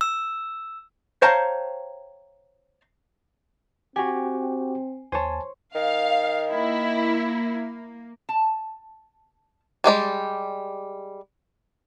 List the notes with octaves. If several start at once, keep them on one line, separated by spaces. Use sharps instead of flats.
E6
C5 C#5 F5 G5 A5 A#5
C4 F#4 G4 G#5
D#2 C5 C#5 G#5 A5
D#3 F5
A#3 E4
A5
G3 G#3 G4 D5